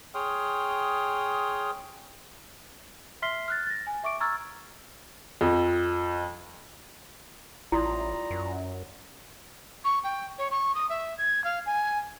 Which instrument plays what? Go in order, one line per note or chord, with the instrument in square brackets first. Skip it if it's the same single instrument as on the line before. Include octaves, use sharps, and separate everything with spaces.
[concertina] G#4 C#5 G5 C6 D#6 F6
[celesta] E5 C6 F6 B6 C7 G7
F6 F#6 A6
A6 A#6
G#5
E5 C#6 D6 D7
A#5 C#6 E6 F6 G#6 A6
[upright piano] F2
[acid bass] A1 [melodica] G3 A#5 [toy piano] E4 [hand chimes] F4 C6 D#6
[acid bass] F#2
[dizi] C#6
G5
C#5
C#6
D#6
E5
G#6
F5
G#5